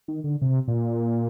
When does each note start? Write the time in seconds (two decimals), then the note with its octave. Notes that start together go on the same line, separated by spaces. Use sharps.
0.08 D#3
0.24 D3
0.42 C3
0.68 A#2